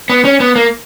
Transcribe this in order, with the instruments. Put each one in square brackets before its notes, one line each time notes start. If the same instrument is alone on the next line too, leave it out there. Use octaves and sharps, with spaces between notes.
[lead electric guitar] B3
C#4
B3
A#3